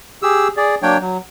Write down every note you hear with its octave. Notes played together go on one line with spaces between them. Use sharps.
G4 G#4 E6
G#4 D5
F#3 A#3 D4 C#5 G5
F#3